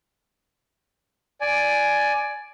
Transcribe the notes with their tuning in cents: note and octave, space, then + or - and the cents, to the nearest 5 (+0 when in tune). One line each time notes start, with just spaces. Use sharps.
D5 +0 G#5 +10